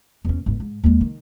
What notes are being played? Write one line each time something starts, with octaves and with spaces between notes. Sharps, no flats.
E2 C#4
G1 G#2
G#2
D#2 G#3
D#3